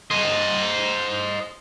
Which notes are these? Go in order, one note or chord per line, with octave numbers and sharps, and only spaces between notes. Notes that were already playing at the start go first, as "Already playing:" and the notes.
C5 D#5